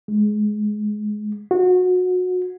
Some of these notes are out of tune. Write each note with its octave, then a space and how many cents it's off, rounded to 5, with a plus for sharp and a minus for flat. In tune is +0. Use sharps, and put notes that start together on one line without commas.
G#3 +20
F#4 -25